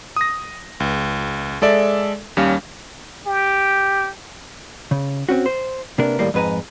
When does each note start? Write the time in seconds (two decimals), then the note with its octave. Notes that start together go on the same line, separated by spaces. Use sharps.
0.16 D#6 A#6
0.80 C#2
1.62 G#3 A4 D5 E5
2.37 D#2 G3 C#4 F5
3.27 G4
4.91 C#3
5.29 C4 C#4 F#4
5.46 C5
5.98 C3 A#3 B3 D4 A#4
6.19 D#2 A2 G3 A#3
6.34 F2 G#2 B4 G#5 A#5